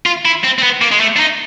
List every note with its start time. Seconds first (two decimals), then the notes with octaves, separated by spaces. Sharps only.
0.06 F4
0.25 E4
0.44 C4
0.59 C4
0.63 B3
0.82 A#3
0.92 G#3
1.00 A3
1.16 D4
1.20 D#4